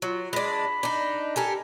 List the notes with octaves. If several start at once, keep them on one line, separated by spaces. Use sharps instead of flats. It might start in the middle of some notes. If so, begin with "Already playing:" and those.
F#3 F4
G#3 D4 B5
D4 D#4
G4 A4 A#4 G#5